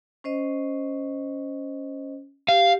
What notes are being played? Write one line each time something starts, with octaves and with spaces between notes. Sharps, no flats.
C#4 C5 D#5
G4 F5